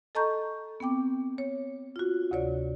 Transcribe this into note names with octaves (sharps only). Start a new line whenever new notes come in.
A4 D#5 A5 A#5 C#6 G6
B3 C4 G5 D6
C#5
F4 F#4
D2 C3 C#5 D5